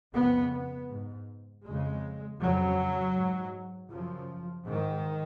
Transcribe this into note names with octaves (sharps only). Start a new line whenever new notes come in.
F2 C#3 B3
B3
G#2
F2 C#3 G#3
F2 C#3 F#3
G#2
F#2 C#3 F3
G#2 D#3